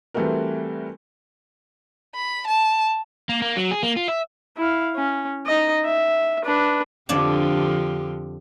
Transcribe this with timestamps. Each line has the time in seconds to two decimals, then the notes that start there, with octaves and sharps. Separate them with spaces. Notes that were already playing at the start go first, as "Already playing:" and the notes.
0.14 E3 G3 A3 C4 F#4 A#4
2.15 B5
2.47 A5
3.29 A#3
3.42 A#3
3.56 F#3
3.71 G#4
3.83 A#3
3.97 F4
4.08 E5
4.57 E4 F5
4.96 C#4
5.46 D#4 D#5
5.85 E5
6.45 D4 B4
7.09 F2 D3 F3 D4 G4 D5